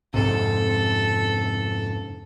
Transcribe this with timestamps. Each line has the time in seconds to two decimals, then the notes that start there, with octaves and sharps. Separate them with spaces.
0.14 F2 G#2 C3 A4